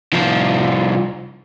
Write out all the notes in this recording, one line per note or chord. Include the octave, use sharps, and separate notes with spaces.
C2 F3